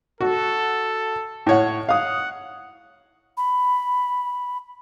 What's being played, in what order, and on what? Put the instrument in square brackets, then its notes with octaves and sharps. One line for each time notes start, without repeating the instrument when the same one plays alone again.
[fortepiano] F#4 [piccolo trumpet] A4
[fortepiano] A2 C#5 F#5
[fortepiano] F5 D#6 [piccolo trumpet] F#5
[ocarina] B5